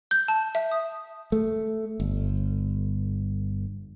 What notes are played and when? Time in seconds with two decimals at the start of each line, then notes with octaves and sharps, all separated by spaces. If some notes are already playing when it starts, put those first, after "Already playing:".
0.11 G6
0.28 A5
0.55 E5
0.71 D#6
1.32 A3
2.00 G1